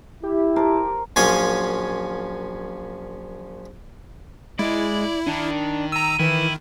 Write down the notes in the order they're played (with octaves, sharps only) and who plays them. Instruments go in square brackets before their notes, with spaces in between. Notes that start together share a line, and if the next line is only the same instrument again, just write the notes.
[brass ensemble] E4 [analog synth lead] G4
[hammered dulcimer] A#4 C5 A5
[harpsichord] A#1 F#2 C#4 F5 G#5 C6
[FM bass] G#3 [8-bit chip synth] E4 [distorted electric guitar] D5
[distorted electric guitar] D#3 [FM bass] D4
[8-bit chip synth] A#5 E6 [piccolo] D#7
[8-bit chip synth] D#3 [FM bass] E3 [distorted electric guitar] E4